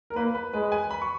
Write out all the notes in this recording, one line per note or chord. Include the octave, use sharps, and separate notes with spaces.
A#4
A#3 B4
B4
G#3 B4
G#5
B5
C#6